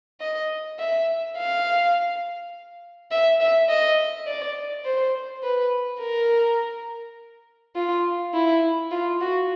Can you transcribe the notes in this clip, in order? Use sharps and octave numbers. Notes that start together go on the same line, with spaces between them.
D#5
E5
F5
E5
E5
D#5
D5
C5
B4
A#4
F4
E4
F4
F#4